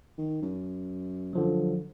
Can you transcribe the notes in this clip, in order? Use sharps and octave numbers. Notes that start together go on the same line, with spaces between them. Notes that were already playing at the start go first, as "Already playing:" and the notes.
D#3
F#2
D3 F3 F#3